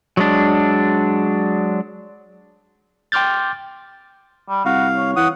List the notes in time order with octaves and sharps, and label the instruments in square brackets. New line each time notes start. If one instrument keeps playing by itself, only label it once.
[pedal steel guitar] F#3 G#3 D4
[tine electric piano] G5 C6 D6 F6 G6 A6
[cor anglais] G3
[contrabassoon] C2 [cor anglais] F#4 [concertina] F5
[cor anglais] C#5
[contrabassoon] E3 [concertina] F#5 D#6